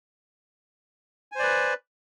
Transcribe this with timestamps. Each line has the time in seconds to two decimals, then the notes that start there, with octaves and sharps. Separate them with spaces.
1.32 G#5
1.35 C5
1.39 D5
1.43 B4